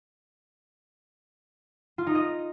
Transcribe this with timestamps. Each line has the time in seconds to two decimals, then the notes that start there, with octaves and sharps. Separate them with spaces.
1.98 F4
2.07 D#4
2.15 D#5